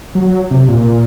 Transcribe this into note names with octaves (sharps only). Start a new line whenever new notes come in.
F#3
C3
A#2